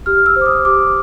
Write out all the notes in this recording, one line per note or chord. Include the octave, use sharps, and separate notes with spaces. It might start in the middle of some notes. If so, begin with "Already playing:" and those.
G4 F6
E6
C5
D6
D#6
G4 D6